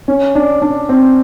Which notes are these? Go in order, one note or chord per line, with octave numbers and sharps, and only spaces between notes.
C#4
D4
D4
C4